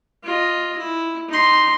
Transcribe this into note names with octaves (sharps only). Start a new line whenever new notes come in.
F4 D#5
E4
D#4 C6